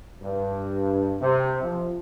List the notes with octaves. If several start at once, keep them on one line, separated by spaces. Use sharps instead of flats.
G2
C3
F3